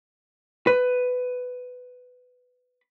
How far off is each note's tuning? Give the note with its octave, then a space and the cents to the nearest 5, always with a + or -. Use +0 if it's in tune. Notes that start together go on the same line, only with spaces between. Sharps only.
B4 +15